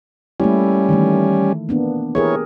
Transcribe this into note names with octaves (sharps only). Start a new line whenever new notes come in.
G3 A3 A#3 C#4 E4
D#3 E3 A3
A#3 B3 D4
E3 G4 G#4 A#4 C#5